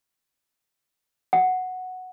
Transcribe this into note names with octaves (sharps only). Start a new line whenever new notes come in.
F#5